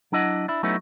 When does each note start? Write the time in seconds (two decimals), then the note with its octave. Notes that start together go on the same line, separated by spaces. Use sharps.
0.12 F#3 D4 E4 D#5 F#5
0.48 D4 E4
0.63 F#3 A3 B3 C#4 D#4 E4